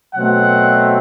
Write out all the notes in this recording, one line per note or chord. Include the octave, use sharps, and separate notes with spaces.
B2 F#3 A3 C4 F#5